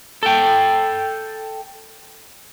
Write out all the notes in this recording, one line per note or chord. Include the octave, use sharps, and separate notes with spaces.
A4 G5